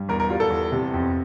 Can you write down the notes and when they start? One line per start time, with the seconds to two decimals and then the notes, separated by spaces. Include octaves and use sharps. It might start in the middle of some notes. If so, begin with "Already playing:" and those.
Already playing: G2
0.08 E2 A#4
0.20 A#4
0.30 G3 F4
0.40 A4
0.50 E2
0.72 C3
0.93 F2